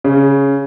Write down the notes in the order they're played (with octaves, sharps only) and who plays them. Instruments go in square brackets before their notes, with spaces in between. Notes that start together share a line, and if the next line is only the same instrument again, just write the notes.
[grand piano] C#3